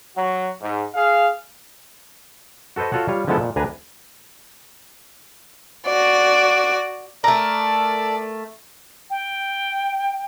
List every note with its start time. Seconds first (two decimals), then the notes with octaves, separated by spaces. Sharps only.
0.15 F#3 F#4
0.61 G#2
0.95 G#4 F5
2.76 F#4 A4 B4 C5 D#5
2.92 F4 F#4 A4 C#5 F#5
3.08 G3 F4 C#5
3.28 D3 F3 G#3 B3 E4 A4
3.40 A#2
3.56 D2 D4 B4 G#5 A#5
5.87 F#4 D5
7.24 A3 A4 A#4 D5 A#5
9.10 G5